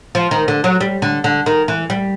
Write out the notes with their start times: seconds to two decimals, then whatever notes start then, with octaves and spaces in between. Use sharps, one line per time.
0.15 F3
0.31 D#3
0.48 D3
0.64 F#3
0.80 G3
1.02 D3
1.24 D3
1.46 D#3
1.68 E3
1.90 G3